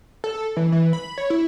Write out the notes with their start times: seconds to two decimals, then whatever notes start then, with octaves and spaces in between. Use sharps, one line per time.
0.24 A4
0.57 E3
0.72 E3
0.93 B5
1.18 C#5
1.30 E4